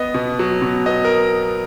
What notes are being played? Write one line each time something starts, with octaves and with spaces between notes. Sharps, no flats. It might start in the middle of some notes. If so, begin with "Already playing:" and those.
Already playing: B3 D#5
B2
F#3
B2
B3 D#5
A#4